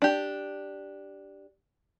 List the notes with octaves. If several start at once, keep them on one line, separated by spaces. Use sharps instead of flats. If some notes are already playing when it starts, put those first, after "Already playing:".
D4 G4